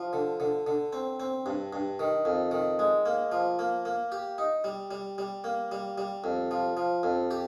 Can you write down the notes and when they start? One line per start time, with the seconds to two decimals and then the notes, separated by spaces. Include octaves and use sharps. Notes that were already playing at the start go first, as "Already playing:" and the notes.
Already playing: F3
0.13 D3
0.40 D3
0.67 D3
0.93 C4
1.20 C4
1.46 G2
1.73 G2
1.99 D#3
2.25 F2
2.51 D#3
2.79 G#3
3.06 A#3
3.32 F3
3.59 A#3
3.85 A#3
4.12 G4
4.38 D#4
4.64 G3
4.91 G3
5.18 G3
5.44 A#3
5.72 G3
5.98 G3
6.24 F2
6.51 F3
6.77 F3
7.03 F2
7.31 G4